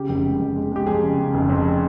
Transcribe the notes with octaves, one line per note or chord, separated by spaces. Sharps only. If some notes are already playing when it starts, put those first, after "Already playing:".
Already playing: C#3 G4
F1
G#3
F1
G#3
G#3 G4
F2 G#4
C#3
C#3
F1
F2